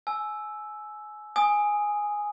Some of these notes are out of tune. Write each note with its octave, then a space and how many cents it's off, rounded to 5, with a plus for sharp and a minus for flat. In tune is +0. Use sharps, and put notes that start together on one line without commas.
G#5 +25 E6 +0
G#5 +0 D#6 +0